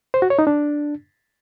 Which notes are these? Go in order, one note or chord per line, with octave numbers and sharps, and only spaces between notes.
C5
F#4
C#5
D#4
D4